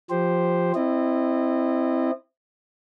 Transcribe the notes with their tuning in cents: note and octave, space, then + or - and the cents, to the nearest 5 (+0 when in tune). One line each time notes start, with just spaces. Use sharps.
F3 +0 G4 +0 C5 +0
C4 +0 E4 +0 D#5 -30